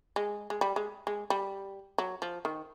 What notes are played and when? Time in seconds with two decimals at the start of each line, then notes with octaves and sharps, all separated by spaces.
0.16 G#3
0.50 G#3
0.61 G3
0.76 G#3
1.07 G#3
1.30 G3
1.98 F#3
2.22 F3
2.45 D#3